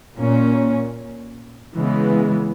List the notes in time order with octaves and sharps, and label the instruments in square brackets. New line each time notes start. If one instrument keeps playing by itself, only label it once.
[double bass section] A#2 A#3 C#4
C#3 E3 G#3 B3